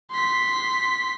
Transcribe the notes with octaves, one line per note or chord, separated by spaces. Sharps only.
C6 B6